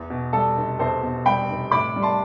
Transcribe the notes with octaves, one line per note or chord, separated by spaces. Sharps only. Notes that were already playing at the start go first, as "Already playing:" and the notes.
Already playing: E2
B2
G3 A4
F1
E2 A4 C5
B2
G3 G5 B5
F1
A2 B5 D6
G3
A5 C6